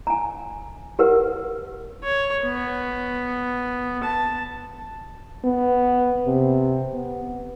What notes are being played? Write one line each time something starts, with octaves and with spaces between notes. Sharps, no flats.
G#5 A#5
G4 A#4 B4 F#5
C#5
B3
A5
B3
C3
B3